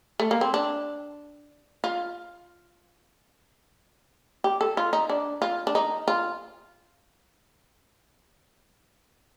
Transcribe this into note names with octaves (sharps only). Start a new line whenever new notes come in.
A3
A#3
C4
D4
F4
G4
A4
F4
D#4
D4
F4
D4
D#4
F4